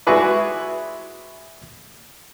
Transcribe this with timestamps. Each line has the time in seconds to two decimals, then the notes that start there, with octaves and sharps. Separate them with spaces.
0.07 G#3 E4 F#4 G#4 B4 D5